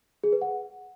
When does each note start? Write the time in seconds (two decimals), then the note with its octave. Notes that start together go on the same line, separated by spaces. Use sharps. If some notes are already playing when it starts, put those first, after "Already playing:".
0.24 G#4
0.33 B4
0.41 F#5